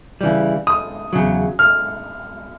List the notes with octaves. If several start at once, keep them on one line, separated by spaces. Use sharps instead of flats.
C#3 E3 G3
D#6
E2 C#3 F#3
F6